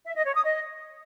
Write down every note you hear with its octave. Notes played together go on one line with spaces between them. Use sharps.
E5
D#5
C#5
D#6
D#5